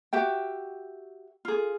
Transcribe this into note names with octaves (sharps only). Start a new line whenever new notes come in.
F#4 G4 E5 G5
F4 G#4